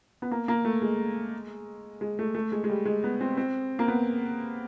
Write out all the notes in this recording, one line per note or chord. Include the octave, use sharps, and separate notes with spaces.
B3
A#3
A#3
A3
G#3
G#3
A3
A3
G#3
G#3
G3
G#3
B3
C4
C4
A#3
B3